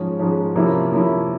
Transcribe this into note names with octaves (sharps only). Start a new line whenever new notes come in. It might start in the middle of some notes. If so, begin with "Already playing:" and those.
Already playing: G#2 F3 G#3 C#4
G#2 F3 G#3 C#4
C3 F3 A#3 C#4 E4
C3 F3 A#3 C#4 E4